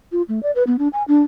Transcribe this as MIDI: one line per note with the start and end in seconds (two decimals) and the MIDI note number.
0.12 0.22 65
0.29 0.42 57
0.43 0.51 74
0.55 0.63 71
0.67 0.76 59
0.79 0.88 62
0.93 1.03 80
1.08 1.22 62